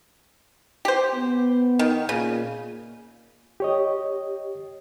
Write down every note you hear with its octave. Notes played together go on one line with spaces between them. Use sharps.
G4 C5
B3
D#3
A#2 C#3
G4 C#5 D#5